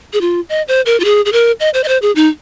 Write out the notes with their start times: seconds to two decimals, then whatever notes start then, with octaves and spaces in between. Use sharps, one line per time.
0.13 G#4
0.21 F4
0.49 D#5
0.68 C5
0.86 A#4
1.00 F4
1.05 G#4
1.25 G#4
1.32 A#4
1.60 D#5
1.74 C5
1.84 D#5
1.88 C5
2.02 G#4
2.15 D#4